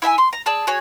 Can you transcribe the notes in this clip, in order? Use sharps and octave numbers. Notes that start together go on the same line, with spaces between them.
E4 E5 G5 G#5
C6
A#5
G#4 D5 A5 E6
F#4 G#4 C#5